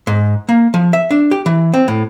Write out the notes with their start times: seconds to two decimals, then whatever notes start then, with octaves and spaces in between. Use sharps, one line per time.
0.07 G#2
0.49 A#3
0.74 F3
0.93 E5
1.11 D4
1.31 G4
1.46 E3
1.74 C4
1.88 A2